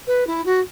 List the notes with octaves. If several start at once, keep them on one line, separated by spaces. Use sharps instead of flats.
B4
E4
F#4